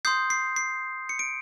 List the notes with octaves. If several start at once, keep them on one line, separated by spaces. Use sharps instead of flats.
C6 D#6 G6 C7
C7
C7
C#7
D7